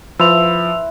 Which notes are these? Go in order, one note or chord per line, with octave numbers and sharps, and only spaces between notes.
F3 E4 B4 C5 E6 F7